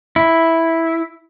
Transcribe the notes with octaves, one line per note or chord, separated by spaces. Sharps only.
E4